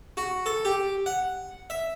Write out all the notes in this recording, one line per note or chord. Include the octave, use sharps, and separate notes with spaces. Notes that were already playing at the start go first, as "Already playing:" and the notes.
F#4
A4
G4
F#5
E5